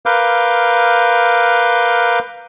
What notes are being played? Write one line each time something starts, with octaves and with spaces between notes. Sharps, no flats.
A#4 B4 F5 D6 G6